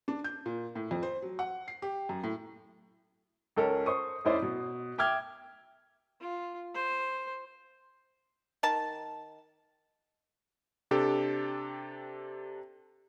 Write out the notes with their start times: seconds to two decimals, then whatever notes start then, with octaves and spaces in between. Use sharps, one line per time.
0.08 D4
0.24 G6
0.46 A#2
0.76 A2
0.91 F2
1.03 C5
1.22 F#3
1.39 F#5
1.68 C7
1.82 G4
2.09 F#2
2.24 A2
3.56 C#2 C#4 A4 A#4
3.86 C5 C#6 D#6
4.25 F1 C#4 E4 C5 D5 D#6
4.42 B2
4.98 E5 G5 D6 F6 G#6
6.20 F4
6.74 C5
8.63 D#3 A5
10.91 C3 D4 G4 A4